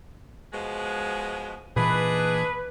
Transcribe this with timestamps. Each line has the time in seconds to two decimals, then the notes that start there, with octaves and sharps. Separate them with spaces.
0.53 B2 F3 G#3
1.76 A#2 E3 D4 D#4 G#4 B4